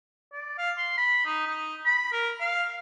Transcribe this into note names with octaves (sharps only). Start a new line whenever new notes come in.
D5
F5
C6
B5
D#4
D#4
B5
A#4
F5